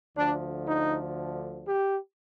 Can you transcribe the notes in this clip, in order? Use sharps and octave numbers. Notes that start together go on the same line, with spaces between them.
D2 D3 F3 D4
D#4
G4